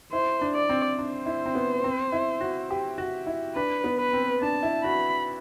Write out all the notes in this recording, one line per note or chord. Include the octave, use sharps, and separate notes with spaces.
E4 C5
D4
D5
C4
D4 C5
E4
C4
B3
C4
E4
F#4
G4
F#4
E4
D4 B4
B3
B4
C4
D4 A5
E4
F#4 B5